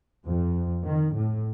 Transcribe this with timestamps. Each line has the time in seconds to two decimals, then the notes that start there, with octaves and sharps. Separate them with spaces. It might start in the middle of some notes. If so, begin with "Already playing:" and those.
0.25 F2
0.84 D#3
1.12 A2